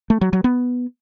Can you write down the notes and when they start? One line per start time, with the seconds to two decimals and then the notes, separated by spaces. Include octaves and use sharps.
0.10 A3
0.21 F#3
0.33 F#3
0.44 B3